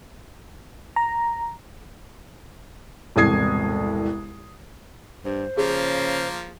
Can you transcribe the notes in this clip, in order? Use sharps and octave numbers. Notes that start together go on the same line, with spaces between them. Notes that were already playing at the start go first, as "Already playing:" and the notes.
A#5
E1 C2 A2 D#6 G#6 C7
G2 C5
C#3 F3 A#3 G#4